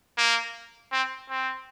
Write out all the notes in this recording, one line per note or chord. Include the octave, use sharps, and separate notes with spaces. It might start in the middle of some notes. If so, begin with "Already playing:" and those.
A#3
C4
C4